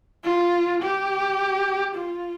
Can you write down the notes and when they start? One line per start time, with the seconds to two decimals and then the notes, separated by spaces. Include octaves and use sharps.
0.24 F4
0.81 G4
1.95 F4